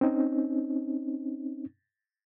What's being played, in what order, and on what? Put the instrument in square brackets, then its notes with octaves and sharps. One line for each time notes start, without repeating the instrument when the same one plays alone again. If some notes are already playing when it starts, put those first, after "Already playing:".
[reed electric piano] C4 C#4 D#4